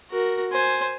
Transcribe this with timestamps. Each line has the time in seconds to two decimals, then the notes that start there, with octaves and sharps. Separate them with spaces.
0.11 F#4 A#4
0.52 C5 G#5